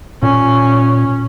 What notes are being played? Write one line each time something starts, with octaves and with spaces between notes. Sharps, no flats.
A#2 C#4